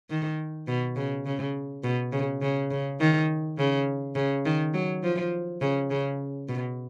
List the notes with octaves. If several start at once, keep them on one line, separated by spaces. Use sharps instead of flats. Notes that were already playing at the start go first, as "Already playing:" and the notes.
D#3
B2
C#3
C#3
B2
C#3
C#3
C#3
D#3
C#3
C#3
D#3
F#3
F3
C#3
C#3
B2